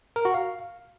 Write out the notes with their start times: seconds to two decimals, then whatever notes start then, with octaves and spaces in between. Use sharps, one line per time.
0.16 A#4
0.25 F#4
0.34 F5